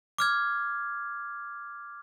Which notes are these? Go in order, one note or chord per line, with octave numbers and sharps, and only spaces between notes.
D6 F6 G#6